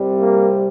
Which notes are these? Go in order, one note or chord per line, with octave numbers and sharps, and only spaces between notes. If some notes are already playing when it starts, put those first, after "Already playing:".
Already playing: C2 C3 G3
A#3